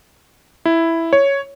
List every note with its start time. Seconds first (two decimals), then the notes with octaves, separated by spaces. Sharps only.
0.65 E4
1.13 C#5